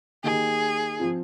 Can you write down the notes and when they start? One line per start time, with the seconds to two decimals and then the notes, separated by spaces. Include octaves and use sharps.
0.24 D#3 A#3 D#4 G4 G#4
0.99 F3 C4 F4